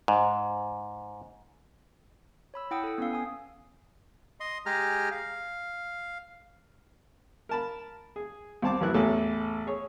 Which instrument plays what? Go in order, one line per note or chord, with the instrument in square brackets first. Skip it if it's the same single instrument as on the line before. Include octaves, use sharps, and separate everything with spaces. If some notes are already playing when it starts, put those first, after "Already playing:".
[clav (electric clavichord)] G#2
[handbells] C#5 B5 E6
E4 F#5 G5 D#6 E6
A4 G5
B3 C#4 F5
G#5 D#6
[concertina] D#5 C6
G#3 G4 G#4 A#5 F6
F5
[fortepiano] A#4 A5 B5
G#4
C2 C4 A5 D6
A1 F#2 A2 B3 E4 F#6
A1 E2 A2 A4 C#5
G#4 C#5